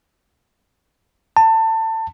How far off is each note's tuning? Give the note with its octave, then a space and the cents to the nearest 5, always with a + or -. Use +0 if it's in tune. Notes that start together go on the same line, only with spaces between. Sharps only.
A5 +25